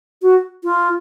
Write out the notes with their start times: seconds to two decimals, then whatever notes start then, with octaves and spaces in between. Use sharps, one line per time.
0.22 F#4
0.64 F4